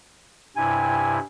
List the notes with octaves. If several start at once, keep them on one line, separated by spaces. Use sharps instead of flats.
G2 C3 E4 G#5